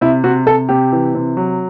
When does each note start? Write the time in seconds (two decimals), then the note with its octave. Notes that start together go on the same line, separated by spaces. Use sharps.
0.01 C3 E4
0.24 C3 F#4
0.46 C3 A4
0.69 C3 G4
0.92 E3
1.15 C3
1.37 F#3